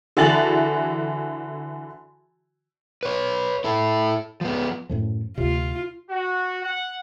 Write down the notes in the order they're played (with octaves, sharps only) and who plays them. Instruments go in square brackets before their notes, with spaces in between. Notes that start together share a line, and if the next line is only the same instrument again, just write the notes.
[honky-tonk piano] D3 E3 F#4 G#4 A6 F#7
[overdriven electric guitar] B4 C#5
E4 A4
F3 B3
[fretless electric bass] F#2 A2 F3
[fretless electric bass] D2 C3 [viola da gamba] F4
[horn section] F#4
F#5